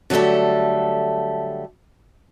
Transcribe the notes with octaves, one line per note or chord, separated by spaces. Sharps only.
D3 F#3 G3 A3 A4